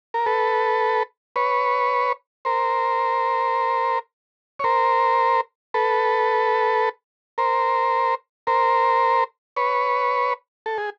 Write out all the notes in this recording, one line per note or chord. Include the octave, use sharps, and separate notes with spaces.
A#4
A4 B4
B4 C#5
A#4 C5
C#5
A#4 C5
A4 B4
A#4 C5
A#4 C5
B4 C#5
A4
G#4